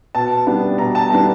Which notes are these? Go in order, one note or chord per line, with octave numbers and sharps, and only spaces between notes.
B2 A5
G3 B3 D4
B2 A#5
A5
G3 B3 D4 A#5